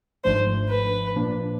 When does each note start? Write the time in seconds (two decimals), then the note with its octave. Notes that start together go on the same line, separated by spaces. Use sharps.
0.24 G#1 G#2 F3 A3 D4 C5
0.69 B4
1.15 A#2 F3 A#3 D4